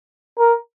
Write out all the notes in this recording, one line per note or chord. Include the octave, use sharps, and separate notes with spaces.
A#4